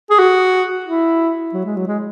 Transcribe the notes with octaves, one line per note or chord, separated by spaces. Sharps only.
G#4
F#4
E4
F#3
G#3
F#3
G#3